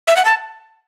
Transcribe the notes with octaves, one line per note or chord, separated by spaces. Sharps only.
E5
F#5
A5